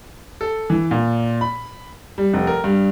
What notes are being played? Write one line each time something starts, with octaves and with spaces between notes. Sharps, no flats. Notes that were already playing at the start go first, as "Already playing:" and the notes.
A4
E3
A#2
B5
G3
F1
A#4
G2